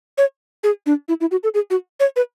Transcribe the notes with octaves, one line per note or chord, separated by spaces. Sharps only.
C#5
G#4
D4
E4
E4
F#4
A4
G#4
F#4
C#5
B4